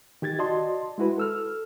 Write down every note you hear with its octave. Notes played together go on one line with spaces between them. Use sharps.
D#3 G4 G#6 A6
F#4 D5 D#5 A5 C6
G#3 E4 F#4 B4
A4 E6 F6